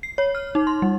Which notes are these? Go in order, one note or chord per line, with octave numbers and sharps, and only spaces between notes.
C7
C#5
F6
D#4
C6
G3